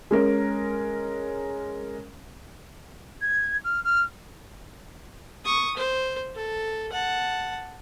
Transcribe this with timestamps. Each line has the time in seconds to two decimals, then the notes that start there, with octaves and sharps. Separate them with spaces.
0.11 G#3 C#4 A#4
3.21 G#6
3.64 F6
3.84 F6
5.45 C#6 D#6
5.77 C5
6.36 A4
6.93 F#5 A5